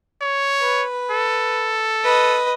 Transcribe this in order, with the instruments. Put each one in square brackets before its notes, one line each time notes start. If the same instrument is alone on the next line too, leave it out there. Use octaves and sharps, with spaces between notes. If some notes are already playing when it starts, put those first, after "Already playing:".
[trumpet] C#5
[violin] B4
[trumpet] A4
[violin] B4 D#5